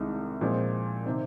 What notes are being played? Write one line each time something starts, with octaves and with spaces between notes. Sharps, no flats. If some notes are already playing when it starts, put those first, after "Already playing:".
Already playing: C2 C3 D#3 G#3
A#2 F3 G#3 C4
C3 D#3 C4